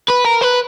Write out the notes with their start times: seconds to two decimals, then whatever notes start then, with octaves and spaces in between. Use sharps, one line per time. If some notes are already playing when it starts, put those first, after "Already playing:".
0.10 B4
0.26 A#4
0.42 B4